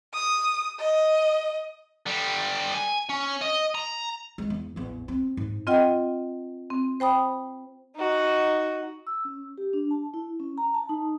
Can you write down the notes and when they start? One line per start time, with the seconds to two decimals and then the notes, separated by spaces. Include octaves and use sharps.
0.14 D#6
0.79 D#5
2.06 D3 G3
2.74 G#5
3.09 C#4
3.41 D#5
3.75 A#5
4.38 G#3
4.50 E2
4.76 A1 E2
5.08 C4
5.37 G#2
5.67 C4 F4 D#5 F#5 G5
6.70 C4
7.00 C5 G5 B5 D#6
7.96 D#4 F#4
9.07 E6
9.25 C#4
9.58 G4
9.73 D4
9.91 A5
10.14 E4
10.40 C#4
10.58 A#5
10.74 A5
10.89 D#4